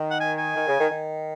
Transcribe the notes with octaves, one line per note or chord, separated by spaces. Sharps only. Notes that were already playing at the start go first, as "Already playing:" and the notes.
Already playing: D#3
F#5
G#5
G#5
D#3
C#3
D#3
D#3